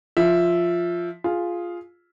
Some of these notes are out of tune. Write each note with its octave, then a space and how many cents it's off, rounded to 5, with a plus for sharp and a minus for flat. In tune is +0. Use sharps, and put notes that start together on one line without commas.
F3 +0 E5 +0
F4 +0 G#4 +5